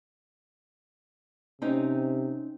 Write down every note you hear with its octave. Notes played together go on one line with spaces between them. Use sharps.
C3 C4 C#4 D#4